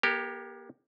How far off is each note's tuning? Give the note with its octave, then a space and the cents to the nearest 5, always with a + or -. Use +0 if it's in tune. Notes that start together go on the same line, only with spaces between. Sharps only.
A#3 +40 G4 +10 A#4 -35